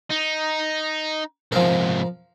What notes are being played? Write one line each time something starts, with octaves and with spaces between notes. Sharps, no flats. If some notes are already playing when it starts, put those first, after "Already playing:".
D#4
C2 G#2 F3 A#4